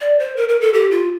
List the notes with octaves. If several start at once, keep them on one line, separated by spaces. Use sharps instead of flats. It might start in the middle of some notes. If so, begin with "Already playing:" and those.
D5
C5
A#4
A#4
A4
G4
F4